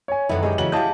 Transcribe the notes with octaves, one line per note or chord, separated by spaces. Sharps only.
C#5 G#5
F#2 D3 D#3 F#3 B3 E4 B4
G#3 C#4 G4
C#3 E3 F#3 F#7
E4 G4 G#4 D#5 F5 A5 G6